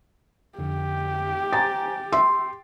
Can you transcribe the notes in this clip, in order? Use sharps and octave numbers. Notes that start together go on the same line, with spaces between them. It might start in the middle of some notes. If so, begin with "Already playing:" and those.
F2 D3 G4
C5 G#5 A#5 A6
E5 C6